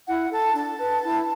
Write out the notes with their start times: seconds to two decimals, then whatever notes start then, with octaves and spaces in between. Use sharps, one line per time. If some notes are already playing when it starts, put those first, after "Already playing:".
0.07 E4 F#5
0.31 A4 A5
0.55 D4 A5
0.79 B4
1.03 E4